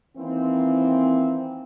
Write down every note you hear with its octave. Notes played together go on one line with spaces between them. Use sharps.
D#3 E3 A#3 C4